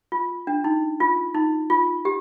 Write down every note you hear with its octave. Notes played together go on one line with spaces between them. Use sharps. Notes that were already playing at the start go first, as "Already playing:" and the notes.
F4
D4
D#4
F4
D#4
F4
G4